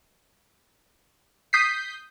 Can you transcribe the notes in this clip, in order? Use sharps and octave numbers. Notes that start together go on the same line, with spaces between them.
D#6 G6 B6 C7